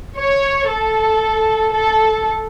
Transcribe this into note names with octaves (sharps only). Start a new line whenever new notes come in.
C#5
A4
A4